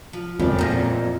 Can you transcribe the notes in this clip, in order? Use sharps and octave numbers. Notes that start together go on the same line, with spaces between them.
F3
E1 A#1 F2 C#3 D5
E2 A#2 A#5 G6 A#6